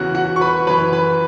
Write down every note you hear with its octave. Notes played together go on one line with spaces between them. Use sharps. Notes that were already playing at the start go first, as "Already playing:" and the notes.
Already playing: E2 C#3 E3 F#4 F#5
F#4 F#5
C#6
B4 B5
F#2 E3 B4 B5
B4 B5